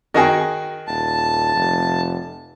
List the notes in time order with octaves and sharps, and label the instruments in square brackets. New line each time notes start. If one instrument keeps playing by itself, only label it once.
[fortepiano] D#3 F#4 G#4 [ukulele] D#5 G5
[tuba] D#1 [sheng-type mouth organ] A5
[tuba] F1